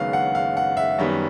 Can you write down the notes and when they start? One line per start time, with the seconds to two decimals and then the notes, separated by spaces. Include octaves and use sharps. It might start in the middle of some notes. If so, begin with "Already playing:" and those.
Already playing: F#1 F#2 D#3 G#3 B3 F5
0.13 F#5
0.35 F5
0.57 F#5
0.77 E5
0.98 F#2 D#3 G3 B3